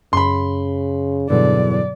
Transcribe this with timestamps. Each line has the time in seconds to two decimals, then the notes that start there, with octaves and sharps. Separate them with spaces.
0.13 F#2 C#3 B5 C6
1.30 E2 G2 B2 D3 F#3 D5